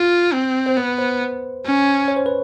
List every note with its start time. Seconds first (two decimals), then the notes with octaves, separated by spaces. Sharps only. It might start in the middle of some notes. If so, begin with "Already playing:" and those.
Already playing: F4
0.33 C4
0.66 C5
0.77 B3 B4
0.98 C5
1.65 C#4
2.08 C#5
2.16 C5
2.26 B4